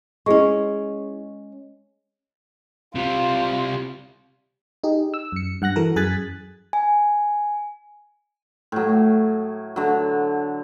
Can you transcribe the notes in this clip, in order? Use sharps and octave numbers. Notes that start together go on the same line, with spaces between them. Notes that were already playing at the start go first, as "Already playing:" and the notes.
G#3 C#4 E4 G#4 C#6
C3 G3 F4
D#4 G4 G#4
E6
F#2 C#7
G2 F#5 F#6 A#6
E3 F#4 A4 A#4
F#2 G#4 G#5 F#6 A6 B6
G#5
A2 F#3
D3 F#3